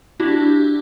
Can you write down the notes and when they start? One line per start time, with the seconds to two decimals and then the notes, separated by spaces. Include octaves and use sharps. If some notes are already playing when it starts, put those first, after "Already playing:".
0.20 D4 E4 F#4 G4